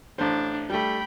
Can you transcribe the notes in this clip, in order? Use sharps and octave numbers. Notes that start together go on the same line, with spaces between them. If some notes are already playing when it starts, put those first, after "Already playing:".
A1 D4 C5
G3 A3 G5 B5